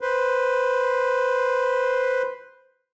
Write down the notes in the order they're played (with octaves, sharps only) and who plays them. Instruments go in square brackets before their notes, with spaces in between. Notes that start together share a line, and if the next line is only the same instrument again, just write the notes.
[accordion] B4 C5